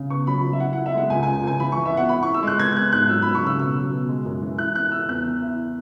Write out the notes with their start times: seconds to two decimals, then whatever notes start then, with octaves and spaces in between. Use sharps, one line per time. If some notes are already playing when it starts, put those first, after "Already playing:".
Already playing: C#3
0.10 B3 C#6
0.27 F#3 B5
0.44 F#3
0.53 E5
0.60 E4 F#5
0.73 F#5
0.77 E4
0.86 E5
0.94 G#3 F#5
1.10 C#2 G#5
1.23 G#5
1.27 C#2
1.43 C#2 G#5
1.59 E3 B5
1.72 C#6
1.77 E3
1.85 E5
1.93 B3 F#5
2.09 E4 B5
2.23 C#6
2.27 E4
2.34 E6
2.43 G#3 F#6
2.59 B3 G#6
2.76 B3 F#6
2.92 G#2 F#6
3.09 F#3 E6
3.22 B5
3.26 F#3 E6
3.35 C#6
3.42 C#3 E6
3.59 B2 E6
3.76 F#3
3.92 B2
4.09 G#3
4.25 F#2
4.42 E3
4.58 E4 F#6
4.75 E4 F#6
4.92 E4 E6
5.09 E2 F#6
5.25 E2
5.42 E4